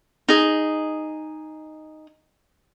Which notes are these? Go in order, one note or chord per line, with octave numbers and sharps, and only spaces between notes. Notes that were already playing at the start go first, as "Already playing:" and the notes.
D#4 G#4